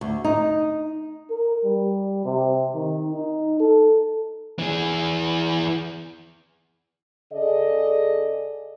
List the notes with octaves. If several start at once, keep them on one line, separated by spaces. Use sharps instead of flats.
D2
D#4
A#4
G3
C3
D#3
D#4
A4
E3 G#4
C#3 G#4 A4 D5 D#5